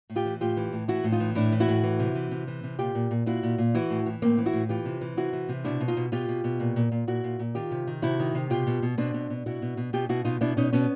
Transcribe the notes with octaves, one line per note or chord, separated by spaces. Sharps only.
A2
F4 G4
E3
A2 F4 G4
E3
A2
E3 E4 F#4
A2
D#4 F4
E3
A2 D4 E4
E3
E4 F#4
A2
E3
C3
E3
C3
E3
C3
A#2 F4 G4
A#2
A#2
A#2 E4 F#4
A#2
A#2
E3 E4 F#4
A2
E3
A2 A#3 C4
E3
E4 F#4
A2
E3 F4 G4
C3
E3
C3 E4 F#4
E3
C3
B2 D4 E4
B2
D#4 F4
B2
B2 F4 G4
B2
B2
A#2
A#2
A#2
A#2 E4 F#4
A#2
A#2
D#3 F4 G4
C3
D#3
C3 E4 F#4
D#3
C3
B2 F4 G4
B2
B2
B2 C4 D4
B2
B2
B2 E4 F#4
B2
B2
B2 F4 G4
B2 E4 F#4
B2 D#4 F4
B2 D4 E4
B2 C#4 D#4
B2 B3 C#4